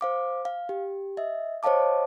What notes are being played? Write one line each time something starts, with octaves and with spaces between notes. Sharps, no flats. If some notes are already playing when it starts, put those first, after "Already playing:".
C5 F5 D6
F5
G4
D#5 E5
C5 C#5 D#5 F5 A5 D6